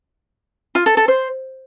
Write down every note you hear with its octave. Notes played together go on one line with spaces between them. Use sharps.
F4
A4
A4
C5